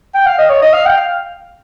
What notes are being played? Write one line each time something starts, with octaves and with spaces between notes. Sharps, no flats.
G5
F5
D#5
C#5
D#5
F5
G5
F5